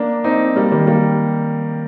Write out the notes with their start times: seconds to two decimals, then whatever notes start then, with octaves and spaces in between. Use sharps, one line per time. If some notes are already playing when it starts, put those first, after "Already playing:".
Already playing: A#3 D4
0.24 C4 D#4
0.56 G3 A#3
0.72 D#3 G3
0.87 G3 A#3